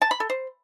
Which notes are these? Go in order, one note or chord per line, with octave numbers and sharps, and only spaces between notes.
A5
B5
A4
C5